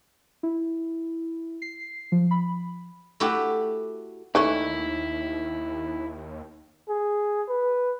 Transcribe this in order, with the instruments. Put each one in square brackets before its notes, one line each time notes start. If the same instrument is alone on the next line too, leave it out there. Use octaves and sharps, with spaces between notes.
[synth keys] E4
C7
F3
B5
[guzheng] A3 E4 F#4 G4
[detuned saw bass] D#2 [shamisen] E3 A3 C#4 [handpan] D#4 [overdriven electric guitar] E4
[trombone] G#4
B4